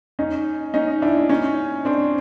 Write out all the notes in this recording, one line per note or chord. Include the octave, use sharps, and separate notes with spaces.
C#4 D#4
C#4 D#4
D4 E4
C#4 D#4
C4 D4